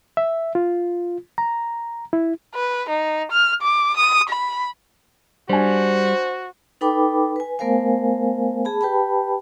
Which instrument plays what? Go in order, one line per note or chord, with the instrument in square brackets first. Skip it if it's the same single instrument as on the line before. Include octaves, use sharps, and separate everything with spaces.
[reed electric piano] E5
F4
A#5
E4
[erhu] B4
D#4
F6
D6
D#6
B5
[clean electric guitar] G3 [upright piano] D4 G#5 [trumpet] F#4 [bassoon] C5
[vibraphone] D#4 A4 B4 G5 B5 D6
B4 G#5
A3 B3 A#4 C5 F5 G#5
G#4 A5 B5
G4 B4 G5 A5 B5